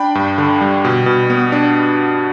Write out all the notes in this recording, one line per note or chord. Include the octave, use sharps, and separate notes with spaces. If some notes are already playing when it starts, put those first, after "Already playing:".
Already playing: D4 G5 B5
G2
D3
G3
B2
B2
B3
D4